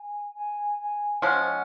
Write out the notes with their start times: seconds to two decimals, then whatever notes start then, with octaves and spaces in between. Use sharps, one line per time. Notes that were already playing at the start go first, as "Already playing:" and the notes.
Already playing: G#5
0.35 G#5
0.79 G#5
1.22 F3 G#3 C#4 F#5